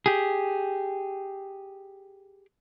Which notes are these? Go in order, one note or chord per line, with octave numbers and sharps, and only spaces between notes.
G4 G#4